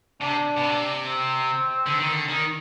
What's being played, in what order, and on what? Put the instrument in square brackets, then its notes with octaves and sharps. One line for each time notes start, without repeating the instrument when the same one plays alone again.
[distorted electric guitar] C3 [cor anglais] D4
[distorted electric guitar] B2
C3
[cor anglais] C4
[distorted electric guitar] D3
D#3
D3
D#3